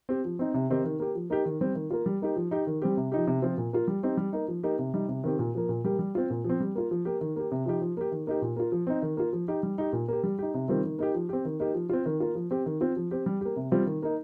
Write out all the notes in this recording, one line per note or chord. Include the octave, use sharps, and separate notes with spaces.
C4 G4
F3
C4 D#4
C3
D#3 C4 D#4 G4
D#3
A#3 G4
F3
A#3 D#4 G4
D#3
G3 C4
D#3
A#3 F4
G3
A#3 D#4 G4
F3
D#4 G4
D#3
G3 C4 G4
C3
F3 D#4 G4
C3
F3 C4 F4
A#2
A#3 F4
G3
C4 D#4 G4
G3
A#3 D#4
F3
A#3 D#4 G4
C3
G3 D#4
C3
D#3 C4 G4
A#2
F3 A#3
A#2
G3 A#3 G4
G3
C4 F4
A#2
F3
C4
G3
A#3 F4
F3
A#3 G4
D#3
A#3 G4
C3
F3 D#4 G4
F3
A#3 G4
D#3
A#3 D#4 G4
A#2
A#3 F4
F3
C4 D#4
D#3
A#3 F4
F3
D#4 G4
G3
D#4 G4
A#2
A#3 G4
G3
D#4 G4
C3
D#3 G3 C4 F4
D#3
A#3 D#4 G4
F3
C4 G4
D#3
A#3 D#4 G4
F3
C4 F4
D#3
A#3 F4
F3
C4 G4
D#3
C4 F4
F3
C4 G4
G3
A#3 G4
C3
G3 C4 F4
D#3
A#3 D#4